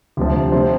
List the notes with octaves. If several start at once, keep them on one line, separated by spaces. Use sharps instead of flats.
D2 C3 F3 G4
C3 F3 C5